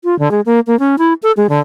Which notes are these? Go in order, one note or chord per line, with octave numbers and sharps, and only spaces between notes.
F4
D3
G#3
A#3
A#3
C#4
E4
A4
G#3
D3